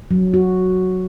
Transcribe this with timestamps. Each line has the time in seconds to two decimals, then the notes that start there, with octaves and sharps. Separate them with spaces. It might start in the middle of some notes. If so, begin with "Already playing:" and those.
0.11 F#3
0.34 F#4